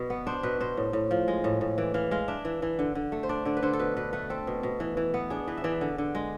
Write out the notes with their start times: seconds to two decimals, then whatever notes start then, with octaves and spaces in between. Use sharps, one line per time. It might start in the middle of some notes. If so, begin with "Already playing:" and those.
Already playing: B2 D5
0.10 B3
0.27 D4 C5
0.43 B2 B4
0.60 B2 C5
0.77 A2
0.93 A2
1.11 F3
1.28 G#3
1.44 A2
1.61 A2
1.78 E3 D5
1.94 E3 F5
2.11 G#3 F5
2.28 D4 E5
2.45 E3
2.62 E3
2.79 D3
2.95 D3
3.12 A3
3.23 C5
3.29 D4 D5
3.45 D3 D5
3.57 B4
3.63 D3 C5
3.73 A4
3.79 B2 B4
3.97 B2 B4
4.13 A3 B4
4.30 C4 A4
4.47 B2
4.63 B2
4.80 E3
4.97 E3
5.14 B3
5.30 D4 G#4
5.48 E3 B4
5.57 E5
5.64 E3 D5
5.81 D3
5.98 D3
6.15 G#3